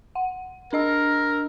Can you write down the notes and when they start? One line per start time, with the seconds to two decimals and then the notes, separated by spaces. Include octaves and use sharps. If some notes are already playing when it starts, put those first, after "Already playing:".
0.15 F#5
0.73 D4 A#4 D#5 E6